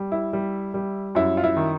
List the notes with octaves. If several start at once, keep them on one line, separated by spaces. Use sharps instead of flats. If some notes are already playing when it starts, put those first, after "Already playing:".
Already playing: G3
E4
G3
G3
F#2 E4
F4
E4
D#3